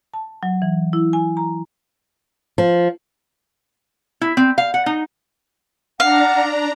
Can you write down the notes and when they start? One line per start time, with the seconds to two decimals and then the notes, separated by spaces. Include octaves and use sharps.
0.14 A5
0.43 F#3
0.62 E3
0.93 E4
1.13 G#5
1.37 A#5
2.58 F3
4.21 E4
4.37 C4
4.58 F5
4.74 F#5
4.86 D#4
6.00 D4 F5 F#5 A#5